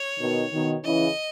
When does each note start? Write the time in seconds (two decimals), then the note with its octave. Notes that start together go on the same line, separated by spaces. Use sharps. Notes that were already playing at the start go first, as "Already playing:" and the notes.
Already playing: C#5
0.19 B2 D#3
0.52 B2 D#3
0.84 C#3 E3 D#5